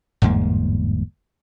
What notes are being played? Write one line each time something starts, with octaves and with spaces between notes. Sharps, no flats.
G1 E2 G#2 A#3